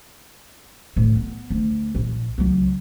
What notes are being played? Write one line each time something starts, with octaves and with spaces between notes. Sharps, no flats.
D2 A2
B3
D2
A#1
C#2 F#3